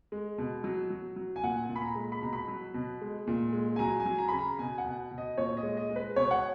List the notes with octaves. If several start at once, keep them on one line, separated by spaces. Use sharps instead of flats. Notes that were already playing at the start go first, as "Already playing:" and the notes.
G#3
B2
F#3
F#3
F#3
G#5
A#2 F#5
G#5
A#2
B5
A#5
G#3
B5
B2 A#5
B5
F#3
B2
G#3
A#2
G#3
G#5
F#3 A#5
G#5
F#3
A#5
C#3 B5
A#5
B2 G#5
F#5
B2
B2
D#5
A#2 C#5
D#5
G#3
D#5
G#3
B4
B2 C#5
F#5